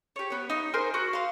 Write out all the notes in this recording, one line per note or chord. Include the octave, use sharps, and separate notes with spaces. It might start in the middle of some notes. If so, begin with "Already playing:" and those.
G4 C#5
B3 C#5
D#4
A#4 C5 G#5 C6
F#4
F5 C6